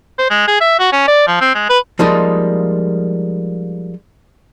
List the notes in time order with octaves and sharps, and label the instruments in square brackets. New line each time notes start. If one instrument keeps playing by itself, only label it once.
[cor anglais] C5
G#3
G#4
E5
F#4
C#4
D5
F3
C4
G#3
B4
[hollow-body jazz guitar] F3 G3 G#3 A#3 D#4 F4